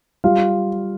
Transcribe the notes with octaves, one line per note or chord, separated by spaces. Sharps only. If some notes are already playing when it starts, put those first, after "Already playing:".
G3 F4 F5